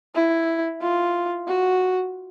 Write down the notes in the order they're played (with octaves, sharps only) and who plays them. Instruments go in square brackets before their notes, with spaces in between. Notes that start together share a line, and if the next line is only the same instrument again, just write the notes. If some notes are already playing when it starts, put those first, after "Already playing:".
[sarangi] E4
F4
F#4